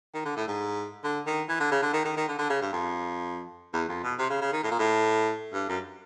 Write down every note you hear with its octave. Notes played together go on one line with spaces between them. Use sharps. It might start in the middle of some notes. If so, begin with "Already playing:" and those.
D#3
D3
A2
G#2
D3
D#3
E3
D3
C#3
D3
D#3
D#3
D#3
D3
D3
C#3
G2
F2
E2
F2
B2
C3
C#3
C#3
D#3
A2
A#2
A2
G2
F#2